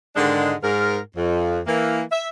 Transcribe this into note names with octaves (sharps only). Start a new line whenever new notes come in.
G#2 D3 D#3 G#3 D4 D#4
G#2 A#4
F2
E3 A#3
E5